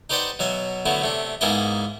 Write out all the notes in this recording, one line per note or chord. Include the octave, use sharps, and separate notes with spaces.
D#4 G4 B4 C5 D5 F#5
B2 F#3 E5 G#5
D3 F#3 A3 B3 E4
C3 A3 D4
G#2 A#3 B3 E4 G#4 D#5